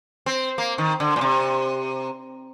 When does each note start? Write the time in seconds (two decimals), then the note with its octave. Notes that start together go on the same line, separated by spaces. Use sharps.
0.26 C4
0.58 A#3
0.78 D#3
1.00 D3
1.16 A#2
1.21 C3